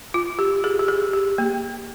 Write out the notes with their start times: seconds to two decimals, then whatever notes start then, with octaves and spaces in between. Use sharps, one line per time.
0.14 F4
0.39 G4
0.64 G#4
0.79 G4
0.88 G#4
1.13 G4
1.38 A#3